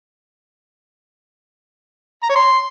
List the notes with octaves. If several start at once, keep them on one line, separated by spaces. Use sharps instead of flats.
A#5
C#5
C6